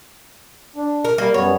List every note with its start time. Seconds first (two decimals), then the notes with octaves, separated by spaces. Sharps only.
0.76 D4
1.05 A#4
1.18 G3 A#3
1.34 F#2 G3 B3 C#5